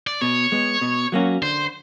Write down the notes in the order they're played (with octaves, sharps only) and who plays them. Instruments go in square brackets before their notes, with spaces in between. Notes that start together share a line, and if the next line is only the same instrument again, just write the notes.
[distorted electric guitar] D5
[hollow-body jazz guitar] B2 [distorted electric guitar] C#5
[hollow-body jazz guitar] G#3 B3
B2
F#3 A#3 C#4 F#4
[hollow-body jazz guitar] D3 [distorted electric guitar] C5